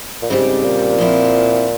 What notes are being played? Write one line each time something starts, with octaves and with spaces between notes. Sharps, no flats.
A#2
G#2 C#3 G3 C4 G4
A#2
F3 C4 E4